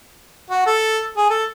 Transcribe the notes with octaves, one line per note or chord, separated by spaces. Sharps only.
F#4
A4
G#4
A4